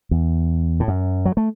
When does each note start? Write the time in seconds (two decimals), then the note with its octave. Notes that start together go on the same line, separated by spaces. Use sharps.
0.11 E2
0.80 A2
0.88 F#2
1.25 F#3
1.37 A3